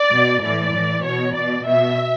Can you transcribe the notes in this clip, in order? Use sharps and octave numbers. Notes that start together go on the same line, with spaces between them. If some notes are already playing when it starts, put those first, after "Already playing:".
Already playing: D5
B2
A2 E3 D5
A2 E3
B2 C#5
B2 D5
B2 E5